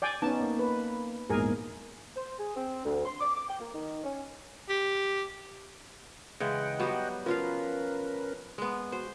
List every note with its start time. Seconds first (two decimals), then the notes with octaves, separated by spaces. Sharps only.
0.02 D5 G5 G#5
0.22 B3 C#4 D#4 A5
0.41 A#3
0.59 B4
1.30 A#1 E2 G#2 G#4 A#4 G#5
2.17 C5
2.38 G#4
2.56 C4
2.85 D2
3.06 C6
3.21 D6
3.36 D6
3.49 G5
3.60 A#3
3.75 D#3
4.04 C#4
4.69 G4
6.40 C#3 E3 G#3 D#5 F#5 G5
6.80 F#3 G3 B3
7.26 F3 C#4 F4 A#4 B4 F5
8.58 G#3 B3
8.92 F#4 C5